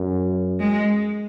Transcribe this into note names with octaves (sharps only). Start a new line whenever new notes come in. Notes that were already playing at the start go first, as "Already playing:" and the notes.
Already playing: F#2
G#3